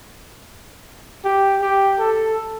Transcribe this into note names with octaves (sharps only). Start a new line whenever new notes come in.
G4
G4
A4